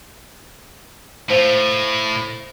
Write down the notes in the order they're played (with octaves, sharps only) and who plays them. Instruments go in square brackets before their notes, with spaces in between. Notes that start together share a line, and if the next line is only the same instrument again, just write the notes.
[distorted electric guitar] A2 [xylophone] C5 F5